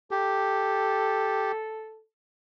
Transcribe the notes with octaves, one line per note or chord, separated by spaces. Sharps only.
G4 A4